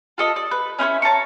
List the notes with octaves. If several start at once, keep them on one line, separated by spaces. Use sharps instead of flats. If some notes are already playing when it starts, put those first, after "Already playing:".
F4 A4 D#5
D5
B4
C#4 E4 C5 C#5
C#5 A5 A#5 C#6